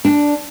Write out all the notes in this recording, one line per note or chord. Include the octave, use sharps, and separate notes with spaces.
D4